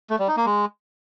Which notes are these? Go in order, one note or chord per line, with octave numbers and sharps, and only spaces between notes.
A3
G3
D#4
A#3
G#3